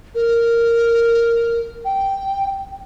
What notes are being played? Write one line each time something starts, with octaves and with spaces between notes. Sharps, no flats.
A#4
G5